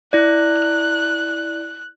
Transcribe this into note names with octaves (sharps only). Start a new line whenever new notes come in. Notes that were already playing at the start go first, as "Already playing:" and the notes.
E4 D5 F#6